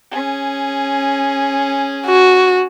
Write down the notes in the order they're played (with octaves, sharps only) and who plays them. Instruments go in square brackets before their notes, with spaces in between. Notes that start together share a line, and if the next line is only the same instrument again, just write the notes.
[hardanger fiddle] C#4 G#4
[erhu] F#4